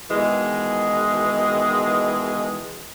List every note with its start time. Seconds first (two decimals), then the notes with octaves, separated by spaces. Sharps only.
0.11 B2 D#3 E3 G#3